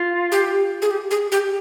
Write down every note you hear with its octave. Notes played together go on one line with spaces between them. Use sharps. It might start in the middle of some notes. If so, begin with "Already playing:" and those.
Already playing: F4
G4
G#4
G4
G#4
G4